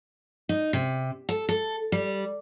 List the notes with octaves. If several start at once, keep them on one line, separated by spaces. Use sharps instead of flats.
D#4
C3
A4
A4
G3